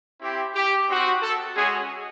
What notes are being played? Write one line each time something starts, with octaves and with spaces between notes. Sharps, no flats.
C4 E4 G4
G4
C4 D#4 F#4
A4
G#3 C#4 F#4 G#4